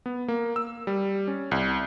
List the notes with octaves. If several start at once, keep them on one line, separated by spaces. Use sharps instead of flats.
B3
A#3
E6
G3
C#4
C2